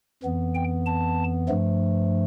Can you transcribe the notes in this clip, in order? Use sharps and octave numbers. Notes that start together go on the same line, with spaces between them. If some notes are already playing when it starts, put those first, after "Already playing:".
F2 E3 B3
G5
A5
G2 F3 A3